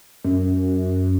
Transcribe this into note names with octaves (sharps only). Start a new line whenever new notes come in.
F#2